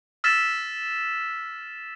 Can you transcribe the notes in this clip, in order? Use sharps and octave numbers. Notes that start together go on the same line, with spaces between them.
E6 F6 A6 B6 E7